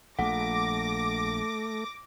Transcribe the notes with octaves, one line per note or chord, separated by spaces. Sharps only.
A#1 A3 F#5 D6 A#6